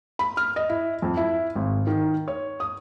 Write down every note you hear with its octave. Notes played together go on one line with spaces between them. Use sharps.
B5
F6
D#5
E4
F2
E4
G#1
D#3
C#5
D#6